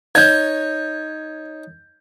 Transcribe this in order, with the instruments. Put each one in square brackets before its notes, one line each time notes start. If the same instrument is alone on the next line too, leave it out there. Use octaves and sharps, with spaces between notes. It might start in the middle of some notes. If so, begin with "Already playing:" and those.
[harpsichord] D#4 C#5 [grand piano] G6 G#6